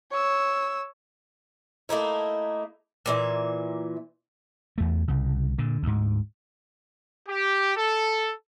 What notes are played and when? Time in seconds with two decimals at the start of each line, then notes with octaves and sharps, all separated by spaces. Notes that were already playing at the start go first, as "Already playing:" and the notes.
0.11 C#5 E6
1.89 A3 A#3 D#4 E4
3.06 A#2 E3 E5
4.78 E2 A3
5.08 C2 C#3
5.58 A#2 D3
5.83 D2 G#2
7.28 G4
7.76 A4